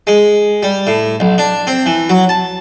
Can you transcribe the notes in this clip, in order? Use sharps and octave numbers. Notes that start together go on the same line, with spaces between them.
G#3
G3
A2
B1
D4
C4
E3
F#3
A5